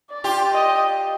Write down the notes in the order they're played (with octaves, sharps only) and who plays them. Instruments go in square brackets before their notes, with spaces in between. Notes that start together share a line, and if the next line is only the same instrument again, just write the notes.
[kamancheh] D5
[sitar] F4 G4
[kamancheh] D#5